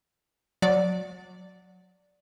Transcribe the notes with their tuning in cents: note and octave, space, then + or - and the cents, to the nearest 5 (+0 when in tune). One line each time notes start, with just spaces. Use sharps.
F#3 -20 D5 +0 F#5 +0